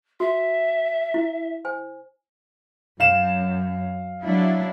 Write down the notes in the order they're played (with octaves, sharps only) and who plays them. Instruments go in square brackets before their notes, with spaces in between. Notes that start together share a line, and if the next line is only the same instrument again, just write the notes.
[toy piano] F#4 [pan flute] E5
[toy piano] E4
C5 G#5
[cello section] F#2 [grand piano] F5 E7
[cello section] F#3 D4 E4